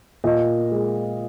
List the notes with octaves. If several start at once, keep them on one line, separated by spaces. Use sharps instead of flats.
A#2 D#5
G#3